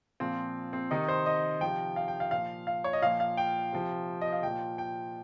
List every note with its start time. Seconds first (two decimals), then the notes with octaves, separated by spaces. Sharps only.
0.20 A#2 F3 C4
0.73 C4
0.91 C3 D#3 D#4
1.08 C5
1.26 D#5
1.61 C3 F3 G5
1.96 F5
2.08 G5
2.20 F5
2.31 A#2 F3 F5
2.67 F5
2.84 C#5
2.93 D#5
3.02 A#2 F3 F5
3.20 F5
3.37 G5
3.73 C3 F3
4.21 D#5
4.32 F5
4.43 A#2 F3 G5
4.78 G5